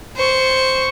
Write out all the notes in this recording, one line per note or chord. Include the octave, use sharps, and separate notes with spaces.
C5 C#6